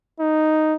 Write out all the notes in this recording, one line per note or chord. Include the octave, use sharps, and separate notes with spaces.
D#4